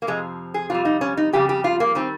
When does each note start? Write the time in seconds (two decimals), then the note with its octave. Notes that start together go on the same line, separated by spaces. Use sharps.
0.02 A#3
0.07 F2 C3 F3 G#3
0.54 G#4
0.70 F2 C3 G3 F4
0.85 D#4
1.01 C#4
1.17 D#4
1.33 F2 C#3 G3 G4
1.49 G4
1.64 F4
1.80 A#3
1.95 D#3 G3 C4